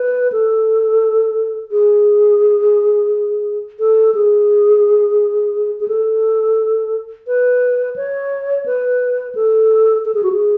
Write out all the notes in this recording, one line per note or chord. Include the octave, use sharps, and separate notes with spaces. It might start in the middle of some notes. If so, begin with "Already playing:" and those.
Already playing: B4
A4
G#4
A4
G#4
G#4
A4
B4
C#5
B4
A4
A4
G#4
F#4
G#4